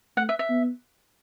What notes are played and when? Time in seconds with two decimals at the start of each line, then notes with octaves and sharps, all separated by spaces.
0.17 A3 F#5
0.29 E5
0.39 E5
0.50 B3